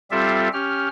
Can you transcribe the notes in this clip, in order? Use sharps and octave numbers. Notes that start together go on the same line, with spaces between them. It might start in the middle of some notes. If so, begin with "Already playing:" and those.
G3 C4 F4 G4 A4 E5
C#4 G4 F6